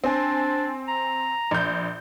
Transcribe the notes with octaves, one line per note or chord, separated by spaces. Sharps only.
C4 D4 G#5
A#5
A#1 G6